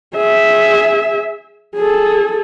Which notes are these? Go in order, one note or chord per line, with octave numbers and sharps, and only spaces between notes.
G#4 E5
G#4 A4